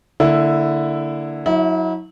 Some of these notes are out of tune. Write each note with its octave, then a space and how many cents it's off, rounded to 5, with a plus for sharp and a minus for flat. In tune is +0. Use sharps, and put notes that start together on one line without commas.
D3 +0 A#3 -25 E4 +0
F#3 -20 E4 -40 E5 +0